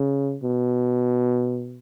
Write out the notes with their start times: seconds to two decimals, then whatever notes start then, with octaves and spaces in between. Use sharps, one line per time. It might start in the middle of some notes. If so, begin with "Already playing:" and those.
Already playing: C#3
0.43 B2